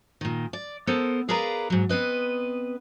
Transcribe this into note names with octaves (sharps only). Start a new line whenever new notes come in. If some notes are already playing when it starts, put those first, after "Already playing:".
A#2 D#3
D5
B3 A4 A#4 C5
G#4 A#4 B4 D5 F5 A#5
G#2 F#3
B3 C4 B4 D#5